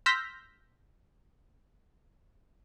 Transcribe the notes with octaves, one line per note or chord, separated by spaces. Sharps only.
C6 E6 F6 G6 A#6 B6